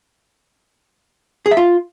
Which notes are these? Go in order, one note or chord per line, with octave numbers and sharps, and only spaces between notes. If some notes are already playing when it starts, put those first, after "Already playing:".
G#4
E5
F4